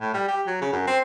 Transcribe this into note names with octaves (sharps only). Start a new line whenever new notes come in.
A2
G3
G4
F#3
C#3
F#2
C4